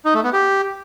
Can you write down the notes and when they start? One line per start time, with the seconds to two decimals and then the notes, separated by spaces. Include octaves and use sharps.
0.05 D#4
0.14 A3
0.24 B3
0.33 G4